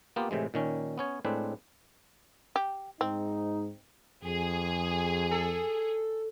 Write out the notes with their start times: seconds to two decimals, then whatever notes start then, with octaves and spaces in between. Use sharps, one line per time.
0.16 A#3 B3 F4 G4
0.31 A2 C3 E3 G#3
0.54 A#2 D#3 C#4
0.98 B3 C#4 C#5
1.25 A2 G#3 C4 D4 B4
2.56 G4
3.01 G#2 C4 D#4
4.24 F2 G#4
5.31 A4